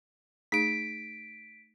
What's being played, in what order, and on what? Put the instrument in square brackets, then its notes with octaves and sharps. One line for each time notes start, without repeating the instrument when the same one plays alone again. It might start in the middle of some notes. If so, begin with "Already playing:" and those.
[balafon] A3 D#4 G#4 [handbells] B6 D7